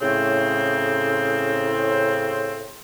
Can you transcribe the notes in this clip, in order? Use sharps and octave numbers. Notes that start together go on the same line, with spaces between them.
A2 C#3 C4